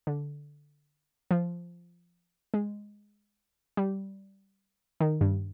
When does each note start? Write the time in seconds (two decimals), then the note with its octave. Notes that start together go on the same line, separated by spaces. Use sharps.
0.07 D3
1.31 F3
2.54 G#3
3.77 G3
5.00 D#3
5.21 G2